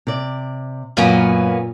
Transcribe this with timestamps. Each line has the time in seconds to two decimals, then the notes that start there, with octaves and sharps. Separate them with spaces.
0.07 C3 D5
0.97 F#2 A#2 A#3 B3 C#4